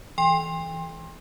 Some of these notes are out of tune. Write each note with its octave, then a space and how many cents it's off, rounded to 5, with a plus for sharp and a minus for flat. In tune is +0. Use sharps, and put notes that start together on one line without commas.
E3 +0 G5 +35 C6 +25